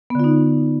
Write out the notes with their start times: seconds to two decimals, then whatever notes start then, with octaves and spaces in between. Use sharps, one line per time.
0.10 B3
0.15 D3
0.20 F4
0.24 D#4